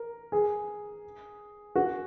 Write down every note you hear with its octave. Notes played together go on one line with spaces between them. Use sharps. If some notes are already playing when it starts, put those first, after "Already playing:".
Already playing: A#4
G#4
F#4